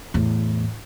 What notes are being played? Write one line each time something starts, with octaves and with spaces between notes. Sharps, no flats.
E2 A2